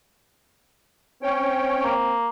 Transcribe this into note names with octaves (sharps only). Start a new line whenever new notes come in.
C4 C#4 C#5 G5
A#3